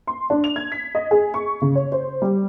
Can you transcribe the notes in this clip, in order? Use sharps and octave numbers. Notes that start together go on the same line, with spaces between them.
C6
D4
F7
G#6
B6
D#5
G#4
C#6
C#3
C#5
C5
G3